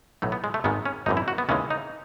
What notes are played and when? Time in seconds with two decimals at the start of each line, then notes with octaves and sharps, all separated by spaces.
0.22 B1 A2 F#3 A3
0.32 B3
0.44 G#3
0.54 A3
0.64 G#1 G#2 D#3 G#3 B3
0.86 C#4
1.06 G#1 F#2 E3 D#4
1.17 E4
1.28 F#4
1.38 B3
1.49 D#2 C#3 E3 G#3 C#4
1.70 D#4